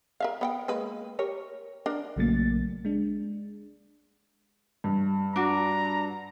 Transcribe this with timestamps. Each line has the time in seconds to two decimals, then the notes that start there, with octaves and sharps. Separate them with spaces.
0.20 A#4 E5 F5
0.41 B3 F#5 G5
0.68 G#3 A#3 B4
1.19 G4 A#4 C#5
1.86 D4 A#4
2.16 A#1 C#3 F#3 A3 A#3 A6
2.85 G#3 D4
4.84 G2
5.36 D4 F#4 A#5